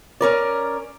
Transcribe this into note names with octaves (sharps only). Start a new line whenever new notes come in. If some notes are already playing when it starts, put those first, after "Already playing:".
C#4 A#4 D5